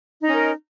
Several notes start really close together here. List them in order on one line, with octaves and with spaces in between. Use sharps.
D#4 D#5 C#4 A#4